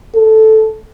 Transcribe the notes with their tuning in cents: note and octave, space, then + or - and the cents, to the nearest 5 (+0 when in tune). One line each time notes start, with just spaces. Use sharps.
A4 -5